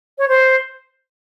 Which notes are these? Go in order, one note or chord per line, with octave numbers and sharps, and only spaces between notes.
C#5
C5